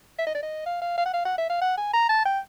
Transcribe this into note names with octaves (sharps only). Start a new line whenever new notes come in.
E5
D#5
D5
D#5
F5
F5
F5
F#5
F5
F#5
E5
F5
F#5
G#5
A#5
A5
G5